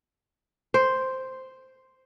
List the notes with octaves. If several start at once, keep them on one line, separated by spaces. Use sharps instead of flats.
C5